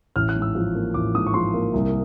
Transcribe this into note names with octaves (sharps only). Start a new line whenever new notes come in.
A1 F6
F#6
G#2
E6
F3
A#3
A1 D6
G#2 D#6
C#6
F3 C6
A#3
C2